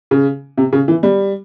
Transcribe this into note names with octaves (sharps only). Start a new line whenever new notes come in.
C#3
C3
C#3
E3
G3